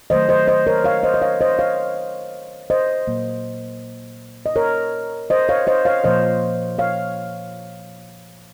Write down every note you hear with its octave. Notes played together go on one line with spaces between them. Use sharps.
D#3 F#3 A3 C5 D#5
C5 D#5
C5 D#5
A#4 C#5
C#5 F5
C5 D#5
D#5
C#5 F5
C5 D#5
C#5 F5
C5 D#5
A#2 F#3 A#3
D#5
A#4 C#5
C5 D#5
C#5 F5
C5 D#5
C#5 F5
A#2 F3 A#3 C5 D#5
C#5 F5